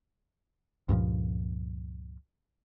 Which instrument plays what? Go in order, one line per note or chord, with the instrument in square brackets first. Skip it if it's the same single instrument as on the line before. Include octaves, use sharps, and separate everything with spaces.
[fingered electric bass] C#2 G2 A#2 F3